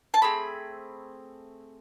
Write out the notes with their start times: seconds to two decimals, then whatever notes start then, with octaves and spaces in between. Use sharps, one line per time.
0.14 A5
0.22 A3 C4 G#4 B5